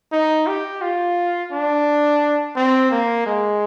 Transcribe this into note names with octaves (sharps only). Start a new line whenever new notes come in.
D#4
G4
F4
D4
C4
A#3
G#3